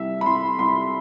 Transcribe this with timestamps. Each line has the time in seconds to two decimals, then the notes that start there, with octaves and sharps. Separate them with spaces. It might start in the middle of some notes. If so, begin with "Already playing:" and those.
Already playing: C2 G3 E5
0.21 B5
0.26 C2 C6
0.59 C2 C6